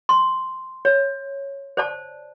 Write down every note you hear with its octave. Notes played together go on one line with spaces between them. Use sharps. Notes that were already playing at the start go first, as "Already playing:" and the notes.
C6
C#5
C5 D5 A5